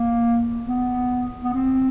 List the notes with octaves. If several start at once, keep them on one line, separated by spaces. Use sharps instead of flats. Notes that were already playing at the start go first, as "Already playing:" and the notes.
Already playing: A#3
B3
B3
C4